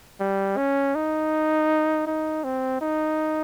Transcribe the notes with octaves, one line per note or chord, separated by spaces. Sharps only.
G3
C#4
D#4
D#4
C4
D#4